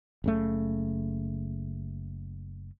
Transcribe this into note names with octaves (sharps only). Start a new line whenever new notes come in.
F#1 C#3 A3